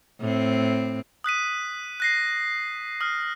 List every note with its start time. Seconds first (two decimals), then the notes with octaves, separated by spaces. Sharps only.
0.20 A2 C4
1.24 D#6 F#6 B6 D#7
2.00 F#6 A#6 C7
3.01 D#6 F6